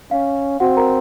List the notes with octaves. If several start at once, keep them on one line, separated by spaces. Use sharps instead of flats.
C#4 F5
C4 F#4 F#5
A#4 A#5